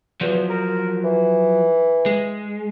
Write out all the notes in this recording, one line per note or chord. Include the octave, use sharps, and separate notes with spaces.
E2 F3 F#3
A#4
E3
G#3